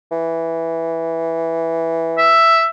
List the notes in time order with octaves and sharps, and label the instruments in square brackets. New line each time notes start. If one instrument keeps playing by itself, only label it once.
[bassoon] E3
[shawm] E5